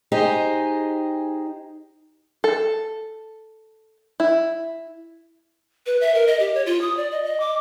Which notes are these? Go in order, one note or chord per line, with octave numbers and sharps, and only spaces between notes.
D#4 G4 G#4 C5 D#5
A4
E4
B4
E5
A#4
D#5
G4
C#5
F4
D#6
D5
D#5
D#5
D6